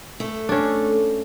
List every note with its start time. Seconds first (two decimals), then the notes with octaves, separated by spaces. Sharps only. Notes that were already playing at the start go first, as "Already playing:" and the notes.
0.20 A3
0.49 C#4 D4